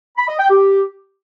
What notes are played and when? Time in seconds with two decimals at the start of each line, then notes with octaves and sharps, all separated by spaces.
0.17 B5
0.28 D#5
0.39 G5
0.50 G4